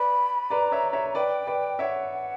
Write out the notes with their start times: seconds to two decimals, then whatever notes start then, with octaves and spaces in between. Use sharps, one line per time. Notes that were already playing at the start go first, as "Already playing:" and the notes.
Already playing: B4 D5 B5
0.50 B4 D5 A#5
0.72 C#5 E5
0.93 C#5 E5
1.15 B4 D5 G5
1.47 B4 D5
1.79 C#5 E5 F#5